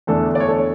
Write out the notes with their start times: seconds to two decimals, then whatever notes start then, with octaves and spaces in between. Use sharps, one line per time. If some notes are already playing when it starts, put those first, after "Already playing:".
0.07 E2 D3 A3 D4 A4
0.35 D5
0.40 C#5
0.48 A4
0.57 C#5